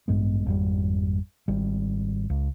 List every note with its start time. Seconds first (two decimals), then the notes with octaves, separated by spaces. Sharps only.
0.08 A1 G2 G#3 B3
0.46 G#1 F2 G3
1.48 G#1 G3
2.30 C#2